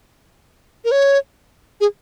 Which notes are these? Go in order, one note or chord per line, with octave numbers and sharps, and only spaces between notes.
A#4
C#5
G#4